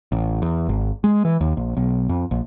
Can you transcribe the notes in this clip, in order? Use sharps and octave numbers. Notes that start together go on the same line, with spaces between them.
A1
E2
G#1
G#3
E3
D#2
A#1
B1
F2
A#1